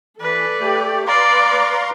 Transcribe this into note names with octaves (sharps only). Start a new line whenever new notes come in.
E3 A4 B4 D5
A3 G4
B4 D5 F5 A#5 C6 D6